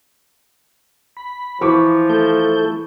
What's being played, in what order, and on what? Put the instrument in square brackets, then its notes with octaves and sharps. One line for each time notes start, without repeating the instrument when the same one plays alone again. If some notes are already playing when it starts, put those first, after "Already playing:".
[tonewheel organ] B5
[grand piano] E3 C#6 D6 [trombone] F3
[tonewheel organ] A3 A4 G6